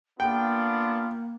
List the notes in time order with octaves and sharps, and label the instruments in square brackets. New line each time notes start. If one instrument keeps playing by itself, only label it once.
[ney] A#3 [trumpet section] B3 D4 F4 [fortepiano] G5